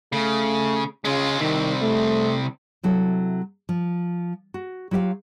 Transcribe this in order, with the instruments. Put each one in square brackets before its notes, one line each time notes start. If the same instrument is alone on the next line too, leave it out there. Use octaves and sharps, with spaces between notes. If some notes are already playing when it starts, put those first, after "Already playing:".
[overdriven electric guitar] C#3 [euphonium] A3
[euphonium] C#3 [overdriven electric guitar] G#3 F4
[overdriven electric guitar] C2 C3 [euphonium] D#3
[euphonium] A3
[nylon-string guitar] C3 F#3 E4 A4
F3
F#4
F#3 F4 G4 E5 F5